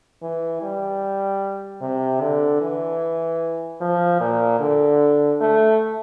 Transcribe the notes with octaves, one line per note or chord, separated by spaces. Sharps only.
E3
G3
C3
D3
E3
F3
A#2
D3
A3